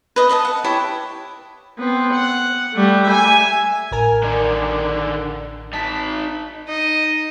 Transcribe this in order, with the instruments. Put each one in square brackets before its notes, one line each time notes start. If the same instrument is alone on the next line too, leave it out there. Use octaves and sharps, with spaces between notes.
[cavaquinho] B4 D#5
B4 D#5 E5 A5
F#5
E4 G4 C#5 A5
[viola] B3 C4
F#5
G3 A3
E5 G#5
[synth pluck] A1 A#4 G#5
[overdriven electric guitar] D3 D#3
[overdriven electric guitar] D#4 A5 [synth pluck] B6
[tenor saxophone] D#4 [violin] D#5